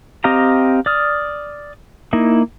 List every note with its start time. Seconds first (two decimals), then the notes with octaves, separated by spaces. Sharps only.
0.24 C4 G4 D#5 F5 A#5
0.86 D5 D#6 F6
2.13 A#3 D#4 E4